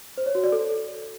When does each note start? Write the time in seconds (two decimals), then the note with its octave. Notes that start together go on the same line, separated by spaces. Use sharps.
0.18 C5
0.26 C#5
0.35 F#4
0.44 D5
0.52 A4